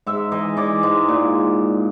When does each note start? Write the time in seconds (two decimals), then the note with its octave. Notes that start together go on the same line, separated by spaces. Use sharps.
0.06 G#2 E5
0.32 E3 D#5
0.57 E3 D5
0.83 G#2
1.08 A#2